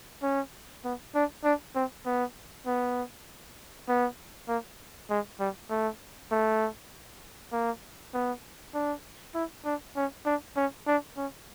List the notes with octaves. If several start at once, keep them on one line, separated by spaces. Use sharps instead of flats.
C#4
B3
D4
D4
C4
B3
B3
B3
A#3
G#3
G3
A3
A3
A#3
B3
D4
E4
D4
C#4
D4
C#4
D4
C#4